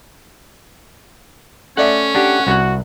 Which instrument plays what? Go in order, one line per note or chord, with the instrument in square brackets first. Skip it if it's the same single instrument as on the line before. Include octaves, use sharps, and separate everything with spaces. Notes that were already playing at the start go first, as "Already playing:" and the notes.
[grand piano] A3 D5 E5 [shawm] C#4 [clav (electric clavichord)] F#5
[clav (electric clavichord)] D4 G4 [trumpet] F#5
[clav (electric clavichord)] C2 F#5 [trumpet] F#4